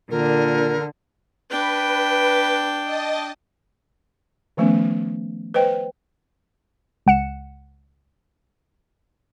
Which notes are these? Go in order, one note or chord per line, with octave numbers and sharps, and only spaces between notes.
A#2 D3 A#4
D4 B4 G5
D#5 A5
D#3 F3 A3 B3 C#4
B4 C5 D#5 G5
C#2 F#5 C#7 E7